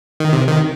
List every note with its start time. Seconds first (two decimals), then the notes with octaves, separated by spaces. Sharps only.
0.20 D#3
0.33 C3
0.47 D#3